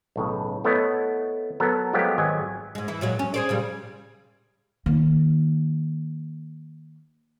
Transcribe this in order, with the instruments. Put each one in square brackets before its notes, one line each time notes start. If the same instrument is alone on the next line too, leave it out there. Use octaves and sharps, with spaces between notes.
[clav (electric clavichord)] B1 A2 C#3
A3 B3 E4 C#5 D#5
F#3 B3 A4 A#4
F3 F#3 G#3 A3 B3 G4
G#1 F#3 D#5 G#5
[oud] G#2 G#3
E3 E4
A#2 F#3 G#3
C#4
G#4 C5 D5
A#2 C#3 G3
[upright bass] D#3 A#3